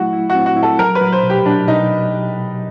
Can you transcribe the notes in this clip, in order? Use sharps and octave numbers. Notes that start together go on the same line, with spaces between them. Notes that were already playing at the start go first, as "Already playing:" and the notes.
Already playing: F#3 A3 E4 F#4
E4
F#4
C4
F#4
E4
A4
F#3 A#4
B4
F#3
C5
B2
G4
F#3 D4
B2 D#4